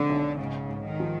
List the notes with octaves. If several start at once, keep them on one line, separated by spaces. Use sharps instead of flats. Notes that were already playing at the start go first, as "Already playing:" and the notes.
Already playing: B2 D3 G#3 C4
B1
G#2 C#3
G#2
D#3
F3